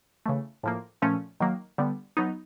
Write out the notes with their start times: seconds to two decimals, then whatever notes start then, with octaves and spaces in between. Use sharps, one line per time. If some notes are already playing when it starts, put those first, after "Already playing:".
0.26 C#3 E3 A3
0.63 A2 F3 A#3
1.02 A#2 F3 A3 C#4
1.40 D#3 F#3 A#3
1.78 D3 G3 B3
2.17 F#3 B3 D#4